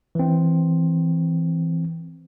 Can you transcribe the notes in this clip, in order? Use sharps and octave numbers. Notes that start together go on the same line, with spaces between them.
E3 C4